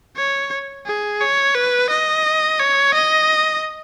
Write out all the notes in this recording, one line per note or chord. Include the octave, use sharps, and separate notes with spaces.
C#5
G#4
C#5
B4
D#5
C#5
D#5